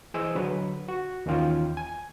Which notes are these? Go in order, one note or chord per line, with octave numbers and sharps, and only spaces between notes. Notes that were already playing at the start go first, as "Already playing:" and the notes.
E3 G#4 C5 D#5 E6
D3 F#3 B4
F#4
D#2 D#3 E3 C#4 F4 G5
G#5